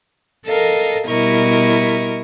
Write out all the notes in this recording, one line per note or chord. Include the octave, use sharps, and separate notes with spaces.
A4 A#4 D#5 F5
B2 G3 E4 A#4 D#5 C#6